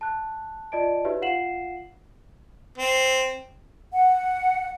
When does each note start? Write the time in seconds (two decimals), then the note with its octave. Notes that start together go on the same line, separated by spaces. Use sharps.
0.01 A5 F#6
0.72 F4 D5 D#5 A5 D7
1.05 D#4 F#4 G4 B4 C#5 E5
1.22 F4 F5 F#5 C7 E7 F#7
2.78 C4
3.92 F#5